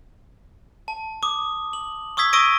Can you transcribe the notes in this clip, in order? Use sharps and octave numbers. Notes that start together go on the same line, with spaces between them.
A5
D6 D#6
F#7
C#6 D#6 E6 G#6 B6
C#6 D#6 E6 A#6 D7 D#7